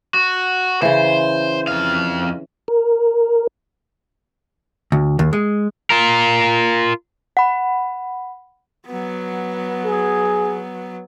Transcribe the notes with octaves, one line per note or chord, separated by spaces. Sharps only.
F#4
C#3 E3 C5
F2 F5
A#4
D2
D#2
G#3
F4 A#4
F#5 B5
F#3 B3
G#4